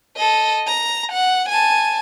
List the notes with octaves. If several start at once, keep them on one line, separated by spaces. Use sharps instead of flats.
A4 D#5
A#5
F#5
G#5 A5